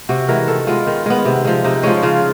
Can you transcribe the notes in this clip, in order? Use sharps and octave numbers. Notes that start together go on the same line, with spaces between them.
C3 F#4
E3 G#3 A#4
D#3 A4
G#3 B3 F4
D#3
G#3 B3
C3
F3 G#3
C3 D#4
F3 G#3 C#4
C#3 F4